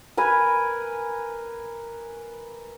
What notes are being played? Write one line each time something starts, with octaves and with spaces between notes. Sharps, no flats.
A#4 B4 G#5